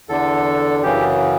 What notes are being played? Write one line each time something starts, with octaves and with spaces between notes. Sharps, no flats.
E2 D3 A4
F#2 C#3 E3 G4